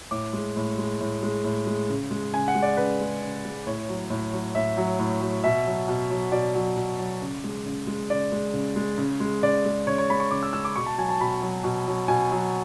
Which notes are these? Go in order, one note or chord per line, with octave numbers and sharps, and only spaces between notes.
A2 D6
G#3
A2
G#3
A2
G#3
A2
G#3
C#3
G#3
C#3 G#5
F#5
G#3
D5
C#3 B4
G#3
C#3
G#3
A2 C#5
F#3
A2
F#3
A2 E5
F#3
A2
F#3
B2 E5
F#3
B2
F#3
B2 D5
F#3
B2
F#3
C#3
G#3
C#3
G#3
C#3 D5
G#3
C#3
G#3
C#3
G#3
C#3 D5
G#3
C#3 C#5
C#5
G#3 B5
C#6
C#3 D6
E6
G#3 E6
D6
B2 C#6
A5
F#3 G#5
A5
B2 B5
F#3
B2
F#3
B2 G#5
F#3